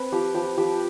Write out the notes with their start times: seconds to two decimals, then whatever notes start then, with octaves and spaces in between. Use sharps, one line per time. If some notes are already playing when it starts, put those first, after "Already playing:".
Already playing: C4 B4
0.12 F3 G4
0.34 F3 G4
0.57 F3 G4